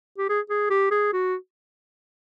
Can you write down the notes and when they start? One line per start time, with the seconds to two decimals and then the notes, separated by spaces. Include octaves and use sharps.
0.18 G4
0.29 G#4
0.50 G#4
0.70 G4
0.91 G#4
1.13 F#4